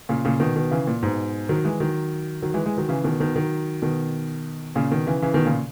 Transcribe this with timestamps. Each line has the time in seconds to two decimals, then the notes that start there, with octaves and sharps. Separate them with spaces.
0.09 A#2 C#3
0.25 A#2 C#3
0.40 B2 D#3
0.56 B2 D#3
0.71 C#3 E3
0.87 A#2
1.03 G#2 B2
1.49 D#3 F#3
1.65 E3 G#3
1.80 D#3 F#3
2.42 D#3 F#3
2.54 E3 G#3
2.66 E3 G#3
2.78 D#3 F#3
2.89 C#3 E3
3.04 B2 D#3
3.20 B2 D#3
3.36 D#3 F#3
3.82 B2 D#3
4.76 A#2 C#3
4.92 B2 D#3
5.07 C#3 E3
5.22 C#3 E3
5.34 B2 D#3
5.46 A#2 C#3